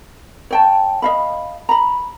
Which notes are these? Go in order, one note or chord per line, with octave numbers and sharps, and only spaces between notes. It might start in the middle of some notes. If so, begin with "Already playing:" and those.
C#5 G5 A5
D#5 F5 B5
A#5 B5